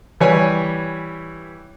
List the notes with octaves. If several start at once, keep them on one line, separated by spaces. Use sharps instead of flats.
E3 G3 B4 C#5 G#5